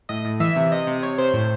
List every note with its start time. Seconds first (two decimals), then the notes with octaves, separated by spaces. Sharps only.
0.09 A2 D#5
0.25 A2
0.40 E3 E5
0.56 C3
0.72 C3 D#5
0.87 C3
1.03 C3 C#5
1.18 C3 C5
1.34 A2